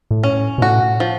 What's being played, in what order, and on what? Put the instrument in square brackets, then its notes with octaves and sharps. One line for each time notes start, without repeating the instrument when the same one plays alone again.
[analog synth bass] A2
[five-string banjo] C#4
[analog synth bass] B2
[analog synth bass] A2 [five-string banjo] F#4
[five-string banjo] F3